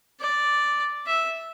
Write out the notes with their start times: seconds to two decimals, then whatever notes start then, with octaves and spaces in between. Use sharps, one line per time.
0.20 D5
1.06 E5